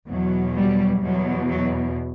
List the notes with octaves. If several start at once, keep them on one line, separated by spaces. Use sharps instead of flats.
E2 B2 F#3
G3
E2 B2 F#3
F#3